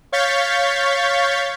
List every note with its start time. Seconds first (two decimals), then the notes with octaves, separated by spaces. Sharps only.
0.12 C#5 F5 C#6 G6 A6 B6